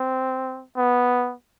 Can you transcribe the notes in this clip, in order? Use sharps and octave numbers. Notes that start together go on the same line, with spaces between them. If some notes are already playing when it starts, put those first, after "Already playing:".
Already playing: C4
B3